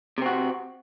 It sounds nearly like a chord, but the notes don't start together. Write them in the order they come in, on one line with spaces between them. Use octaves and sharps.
C3 C4 F#4